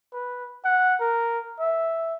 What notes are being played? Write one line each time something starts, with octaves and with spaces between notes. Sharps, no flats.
B4
F#5
A#4
E5